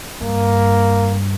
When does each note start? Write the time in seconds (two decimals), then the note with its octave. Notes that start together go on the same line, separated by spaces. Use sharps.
0.21 G2 A#3